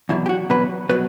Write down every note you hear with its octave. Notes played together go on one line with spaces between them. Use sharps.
E2 B2 F#3 E4
G4
F#4
E2 B2 F#3 B4
B2 F#3 B4